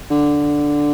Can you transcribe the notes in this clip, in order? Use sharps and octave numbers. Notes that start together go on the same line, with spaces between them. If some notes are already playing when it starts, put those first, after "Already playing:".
D3